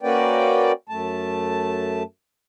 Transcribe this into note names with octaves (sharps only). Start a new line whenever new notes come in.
A#3 C#4 F#4 B4 D5 G5
F#2 A3 A5